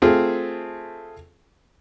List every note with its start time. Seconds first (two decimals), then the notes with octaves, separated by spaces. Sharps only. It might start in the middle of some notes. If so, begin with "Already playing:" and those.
0.02 A3 C4 F4 G#4